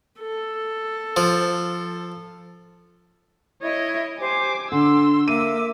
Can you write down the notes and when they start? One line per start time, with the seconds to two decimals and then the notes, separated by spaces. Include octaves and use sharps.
0.20 A4
1.17 F3
3.62 E4 C#5 D#5 G#6
4.19 G4 C5 G#5 D6
4.72 D3 C6 E6
5.28 A#3 E5 D6 E6 D#7